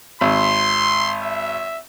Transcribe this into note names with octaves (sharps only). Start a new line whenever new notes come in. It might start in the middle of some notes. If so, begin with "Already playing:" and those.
G#1 C6
E5